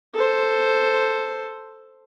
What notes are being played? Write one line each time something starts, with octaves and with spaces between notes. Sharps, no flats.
A4 C5